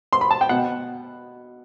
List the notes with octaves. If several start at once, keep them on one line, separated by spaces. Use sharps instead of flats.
C6
B5
A5
G5
B2 F#5